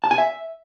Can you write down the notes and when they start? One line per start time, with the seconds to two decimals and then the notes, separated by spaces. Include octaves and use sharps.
0.04 A5
0.11 G#5
0.18 E5